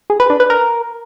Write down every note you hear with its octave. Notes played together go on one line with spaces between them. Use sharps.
G#4
B4
D4
B4
A#4